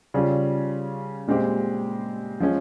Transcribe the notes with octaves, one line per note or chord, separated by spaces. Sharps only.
C#3 G3 C#4 F4
A#2 G#3 C4 G4
F3 G#3 C#4